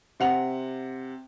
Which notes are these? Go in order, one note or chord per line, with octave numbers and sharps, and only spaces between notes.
C3 F#5 F7